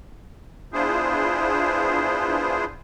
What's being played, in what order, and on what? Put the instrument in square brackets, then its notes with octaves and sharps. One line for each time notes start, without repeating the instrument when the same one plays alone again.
[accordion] B3 D4 E4 F4 G#4 C5